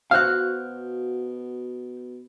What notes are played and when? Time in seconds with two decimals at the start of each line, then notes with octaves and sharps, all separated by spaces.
0.11 B2 F#4 C5 F5 F6 F#6